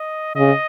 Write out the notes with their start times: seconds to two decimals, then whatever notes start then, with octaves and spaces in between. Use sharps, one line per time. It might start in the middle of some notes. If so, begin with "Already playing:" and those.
Already playing: D#5
0.36 C#3 D#5